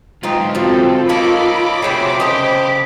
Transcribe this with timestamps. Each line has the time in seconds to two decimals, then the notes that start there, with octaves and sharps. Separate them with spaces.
0.23 B1 G#2 C4 D#4 F4
0.55 B2 F3 C4 A4
1.09 A#3 D#4 A4 C#5 D#5 B5 D6
1.82 C3 A3 F#4 G#4 C#5 G5
2.20 C#3 G4 A4 C5 D#5